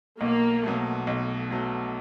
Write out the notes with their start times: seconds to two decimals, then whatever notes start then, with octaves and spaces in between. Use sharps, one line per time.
0.21 B1 A#3
0.63 B2 F#3 A3
1.07 B1
1.50 B2 F#3 A3